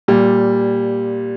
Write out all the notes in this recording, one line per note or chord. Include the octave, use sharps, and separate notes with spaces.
A#2 G3